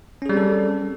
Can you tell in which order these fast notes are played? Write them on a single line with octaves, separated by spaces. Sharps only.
C#4 G#4 G3 C4 A4